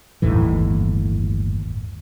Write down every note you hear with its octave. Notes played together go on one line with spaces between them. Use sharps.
G1 D#2 A2 E3